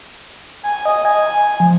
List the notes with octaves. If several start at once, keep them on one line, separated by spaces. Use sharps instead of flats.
G#5
D#5
G#5
G#5
F3